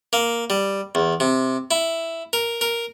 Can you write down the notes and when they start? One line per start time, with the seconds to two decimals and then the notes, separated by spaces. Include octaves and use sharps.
0.13 A#3
0.50 G3
0.95 E2
1.20 C3
1.71 E4
2.33 A#4
2.61 A#4